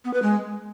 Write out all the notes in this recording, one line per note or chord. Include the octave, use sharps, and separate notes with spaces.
B3
B4
G#3